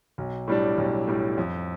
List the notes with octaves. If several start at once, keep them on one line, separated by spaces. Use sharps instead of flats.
B1
A2 G3 D4
B1
A2 G3 D4
F2